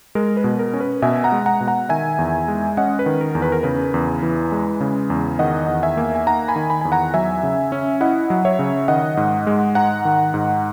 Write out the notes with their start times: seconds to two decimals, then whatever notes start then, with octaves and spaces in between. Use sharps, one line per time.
0.15 G#3 A#4
0.37 B4
0.44 B2
0.59 A#4
0.74 C#4
0.80 B4
1.02 B2 E5 G#5
1.24 F#5 A#5
1.32 G#3
1.46 F#5 A#5
1.61 B2
1.67 F#5 A#5
1.89 D#3 E5 G#5
2.19 E2
2.48 G#3
2.77 C#4 D#5 F#5
2.99 B4
3.06 D#3
3.21 A#4
3.35 E2
3.42 B4
3.52 A#4
3.63 C#3 B4
3.94 E2
4.23 E3
4.52 G#3
4.81 C#3
5.10 E2
5.39 D#3 D#5 F#5
5.68 E2
5.83 E5 G#5
5.97 A#3
6.15 G#5
6.27 D#4 F#5 A#5
6.48 G#5 B5
6.56 D#3
6.70 G#5 B5
6.81 E2 G#5
6.92 F#5 A#5
7.14 F#3 E5 G#5
7.43 C#3
7.72 C#4
8.01 E4 D#5 F#5
8.30 F#3
8.45 C#5 E5
8.59 C#3
8.88 D#3 D#5 F#5
9.17 G#2
9.47 G#3
9.75 G#2 F#5 A#5
10.05 D#3
10.34 G#2